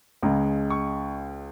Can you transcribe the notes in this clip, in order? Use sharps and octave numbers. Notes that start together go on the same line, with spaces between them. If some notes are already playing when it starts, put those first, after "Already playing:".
C#2 C#3 G#3 A#5
C#6